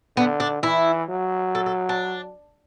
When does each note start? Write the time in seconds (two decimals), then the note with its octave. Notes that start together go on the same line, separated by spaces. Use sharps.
0.17 D3 B3
0.40 D4
0.62 E3 E4
1.09 F#3
1.55 A4
1.66 A4
1.89 D4